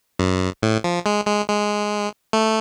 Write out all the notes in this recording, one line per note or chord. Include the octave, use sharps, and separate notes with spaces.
F#2
A2
F3
G#3
G#3
G#3
A3